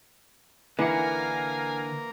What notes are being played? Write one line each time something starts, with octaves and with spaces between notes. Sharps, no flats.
D3 E3 A#3 D4 A#4 F5 F#5 G#5